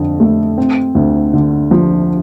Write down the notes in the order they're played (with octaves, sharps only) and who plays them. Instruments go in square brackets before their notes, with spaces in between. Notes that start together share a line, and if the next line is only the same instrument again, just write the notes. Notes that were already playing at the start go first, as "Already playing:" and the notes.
Already playing: [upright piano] F2 D3
A3
C4
D2
D3
F3